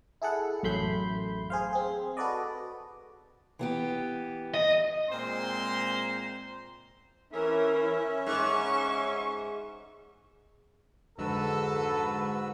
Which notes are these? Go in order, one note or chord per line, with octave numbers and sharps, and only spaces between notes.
E4 G#4 A4 F#5
A1 F#2 A3 B5 C6 G6
G#4 C5 F5
C4 G#4
F#4 A4 B4 D5 D#5
E3 B3 G4
D#5
A#2 G#3 C4 C5 A#5 C6
E3 C#4 A#4 E5
G#2 C#6
F2 G#2 D3 G#3 F#4 A4 B4 E6